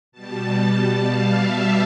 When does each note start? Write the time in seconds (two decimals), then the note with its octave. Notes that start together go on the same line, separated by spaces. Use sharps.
0.12 B2 G3 A5
1.03 F5
1.33 E5